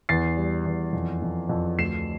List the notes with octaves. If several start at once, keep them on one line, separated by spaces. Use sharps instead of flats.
E2 A6 C7
G3
E2
F2
F2
F2
D2 C7 E7